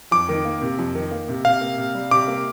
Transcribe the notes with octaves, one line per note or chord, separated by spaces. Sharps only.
F2 D6
D#3
A#3
C3
F2
D#3
A#3
C3
C3 F5
A#3
C3
G3
C3 D6
A#3